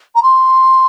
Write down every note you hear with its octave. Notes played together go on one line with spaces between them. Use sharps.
A#5
C6